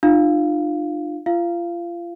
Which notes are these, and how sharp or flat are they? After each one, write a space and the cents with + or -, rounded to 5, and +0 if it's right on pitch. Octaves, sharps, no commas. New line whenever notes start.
D4 +45 F4 -5 F5 +0
F4 -30 F5 -20